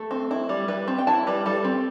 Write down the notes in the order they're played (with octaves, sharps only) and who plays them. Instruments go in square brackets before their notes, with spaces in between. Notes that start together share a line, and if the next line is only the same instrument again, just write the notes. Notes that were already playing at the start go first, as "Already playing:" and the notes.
Already playing: [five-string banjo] A3 A4
C4
E4
G3
G3 B4
C4
G5
E4 A5
G3 B4
G3 A4
C4